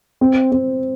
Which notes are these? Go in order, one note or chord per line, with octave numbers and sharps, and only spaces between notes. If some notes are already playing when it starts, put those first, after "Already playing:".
C4
C4